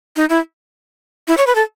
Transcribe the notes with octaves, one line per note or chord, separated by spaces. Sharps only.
D#4
E4
E4
C#5
B4
A4